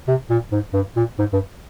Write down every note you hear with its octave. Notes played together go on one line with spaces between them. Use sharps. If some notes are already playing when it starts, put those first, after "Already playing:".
C3
A#2
G#2
G2
A#2
G#2
G2